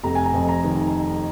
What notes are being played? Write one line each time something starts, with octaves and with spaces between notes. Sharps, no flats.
F1 A#5
G#5
A#5
F2
A#5
D#3